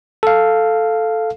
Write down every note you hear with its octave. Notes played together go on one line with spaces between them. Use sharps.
A4 F5